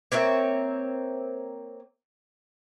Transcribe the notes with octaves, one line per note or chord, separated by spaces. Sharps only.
A#3 C4 C#5 E5